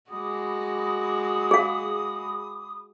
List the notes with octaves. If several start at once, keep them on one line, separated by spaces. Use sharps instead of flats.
G#3 F#4 B5 D6 D#6
G#4 F5